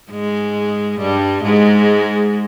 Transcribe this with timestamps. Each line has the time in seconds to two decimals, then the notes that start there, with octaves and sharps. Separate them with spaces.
0.11 G#2 G#3
1.00 G2 G3
1.44 G#2 G#3